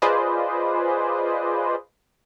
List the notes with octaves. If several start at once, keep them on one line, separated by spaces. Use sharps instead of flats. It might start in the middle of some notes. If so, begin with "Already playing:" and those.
F4 G#4 B4 C5 D5 D#5